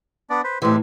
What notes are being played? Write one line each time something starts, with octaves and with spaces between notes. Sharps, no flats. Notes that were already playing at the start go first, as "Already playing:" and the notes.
B3 D4 D5
B4 C5
A2 E3 G#3 C4 G4